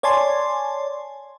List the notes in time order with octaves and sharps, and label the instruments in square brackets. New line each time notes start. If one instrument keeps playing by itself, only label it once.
[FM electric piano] C#5 D5 G#5 A5 C6